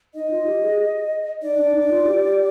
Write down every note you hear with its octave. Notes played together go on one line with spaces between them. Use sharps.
D#4 D#5
F4
G4
G#4
D#4 D5
D4
D#4
F4
G4